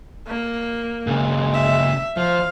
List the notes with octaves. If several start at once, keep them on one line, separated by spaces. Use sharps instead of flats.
A#3
A#2 C#3 G#3
E5
F3 C5 F5